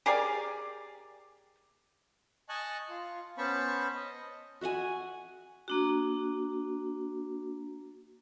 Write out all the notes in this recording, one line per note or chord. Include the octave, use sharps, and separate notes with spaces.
G4 G#4 A#4 D5
D#5 G#5 A5 C#6 F#6
F4
B3 C#4 C5 A5 B5 C#6
D#5
F#4 E5 F#5 G#5
A#3 D4 F#4